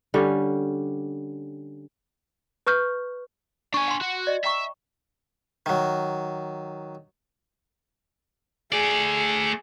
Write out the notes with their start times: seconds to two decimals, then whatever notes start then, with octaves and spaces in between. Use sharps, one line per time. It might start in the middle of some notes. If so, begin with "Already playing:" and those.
0.14 D3 G3 C#4
2.67 B4 C#6 F6 G6
3.74 D4 G#5 C#6
3.88 F#5 C6
4.02 F#4
4.27 D5 D#5
4.44 E5 G5 A#5 C#6
5.66 D#3 F#3
8.72 A3 G#4 D5